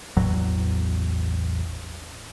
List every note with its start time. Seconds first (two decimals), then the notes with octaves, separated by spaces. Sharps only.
0.17 A1 E2 F#3